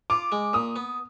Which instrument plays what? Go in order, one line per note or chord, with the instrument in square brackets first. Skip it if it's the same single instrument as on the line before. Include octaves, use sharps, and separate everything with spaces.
[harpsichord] F4 [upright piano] D6
[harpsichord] G#3
[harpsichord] A#2 [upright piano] D#6
[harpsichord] B3